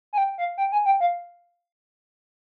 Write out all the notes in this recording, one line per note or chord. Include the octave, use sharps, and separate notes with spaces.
G#5
G5
F5
G5
G#5
G5
F5